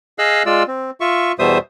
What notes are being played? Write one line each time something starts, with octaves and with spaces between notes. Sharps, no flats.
G#4 D#5 F5 E6 F#6
G#3 F4 D5 E6
C4
F4 E5 C#6
E2 B2 G3 C5 E5 D#6